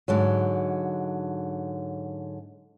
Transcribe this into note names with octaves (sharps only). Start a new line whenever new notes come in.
G#2 D3 F#3